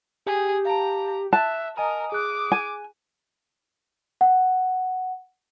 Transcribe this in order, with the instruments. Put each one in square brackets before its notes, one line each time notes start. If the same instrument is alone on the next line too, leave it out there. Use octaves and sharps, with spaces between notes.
[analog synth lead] G4 [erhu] G#4
[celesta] F5 A5 [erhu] A#5
[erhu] E5 [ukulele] A5 [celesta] F#6
[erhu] A#4 [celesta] D#5 G#5 A#5 [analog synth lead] D#6
[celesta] G#4 F#6 [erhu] D6
[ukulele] G#5
[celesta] F#5